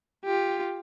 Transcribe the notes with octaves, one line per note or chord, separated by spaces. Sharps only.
F4 G4